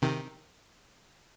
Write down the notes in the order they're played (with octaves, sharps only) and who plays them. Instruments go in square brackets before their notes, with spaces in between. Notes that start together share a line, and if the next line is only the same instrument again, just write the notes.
[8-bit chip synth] C3 D#3